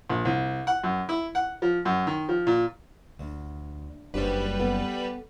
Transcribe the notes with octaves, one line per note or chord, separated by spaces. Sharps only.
A#1
C2
F#5
F#2
E4
F#5
F3
F#2
D#3
F3
A#2
D2
F#1 G3 D4 G4 B4 C5
B3 A4